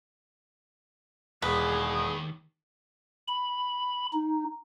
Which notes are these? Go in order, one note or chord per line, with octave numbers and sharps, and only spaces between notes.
E1 D#2 D#3 G#4 B4
B5
D#4